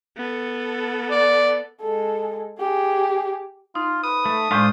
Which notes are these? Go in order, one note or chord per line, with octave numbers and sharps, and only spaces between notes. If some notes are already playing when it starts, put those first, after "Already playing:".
B3 A4
D5
G#3 A4
G4 G#4
D#4 F4
B4 D#6
A3
A2 G#3 D4 F4 C5